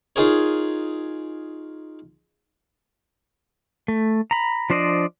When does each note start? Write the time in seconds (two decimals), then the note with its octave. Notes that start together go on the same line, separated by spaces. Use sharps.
0.16 D#4 F4 G#4 A#4 C#5
3.88 A3
4.31 A#5 B5
4.70 F3 D4 C5 D5 D#5